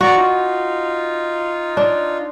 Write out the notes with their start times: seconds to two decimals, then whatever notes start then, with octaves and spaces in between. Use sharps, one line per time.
0.01 F#4 D5 A#5 C#6
0.16 D#4 F4
1.77 D4